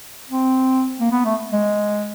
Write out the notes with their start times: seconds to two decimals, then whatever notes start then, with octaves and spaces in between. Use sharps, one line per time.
0.29 C4
1.00 A#3
1.11 B3
1.25 A3
1.52 G#3